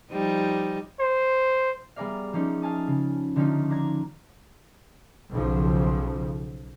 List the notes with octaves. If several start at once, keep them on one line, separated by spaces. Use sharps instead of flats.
F3 G3 D#4
C5
G3 B3 G#4 A#4 D5 F5
F3 A#3 C#4 D#4
F5 G#5 A5 D#6
C#3
D3 F3 A#3 C#4 D#4 F4
D4 A#5 G#6
B1 C#3 F3